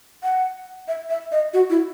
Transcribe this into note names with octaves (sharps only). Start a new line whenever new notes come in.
F#5
E5
E5
D#5
F#4
E4